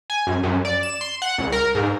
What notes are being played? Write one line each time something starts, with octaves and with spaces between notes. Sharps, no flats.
G#5
F#2
F#2
D5
E7
C6
F#5
C#2
A#4
G#2